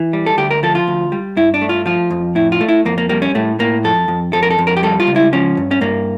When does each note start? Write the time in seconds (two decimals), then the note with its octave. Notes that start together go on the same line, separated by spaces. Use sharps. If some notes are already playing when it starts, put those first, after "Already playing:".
Already playing: E3
0.13 G3
0.26 A4
0.37 D2 G4
0.51 A#4
0.63 F3 A4
0.75 F4
0.88 D2
1.12 G3
1.36 G2 E4
1.54 D4
1.62 A3
1.69 F4
1.86 F3 F4
2.10 F2
2.35 A2 E4
2.52 F4
2.61 A3
2.68 E4
2.85 F2 A#3
2.98 A#3
3.09 G3 A#3
3.22 C#4
3.35 A2 A3
3.59 A2 A#3
3.84 F2 A4
4.08 F2
4.33 F2 A4
4.43 A#4
4.51 A4
4.58 F2
4.67 A#4
4.77 G4
4.83 G3 A4
5.00 F4
5.07 C#2
5.16 E4
5.33 F3 C#4
5.57 G2
5.71 C#4
5.81 G2 A#3